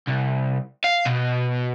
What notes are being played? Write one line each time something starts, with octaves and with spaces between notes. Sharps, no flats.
C2
F5
B2